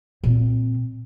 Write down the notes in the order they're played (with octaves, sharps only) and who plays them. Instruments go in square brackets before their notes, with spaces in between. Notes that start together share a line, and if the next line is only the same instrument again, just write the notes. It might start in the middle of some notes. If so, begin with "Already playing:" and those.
[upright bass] A#2 C4